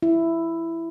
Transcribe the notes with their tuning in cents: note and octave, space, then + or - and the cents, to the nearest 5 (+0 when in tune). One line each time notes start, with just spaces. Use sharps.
E4 +5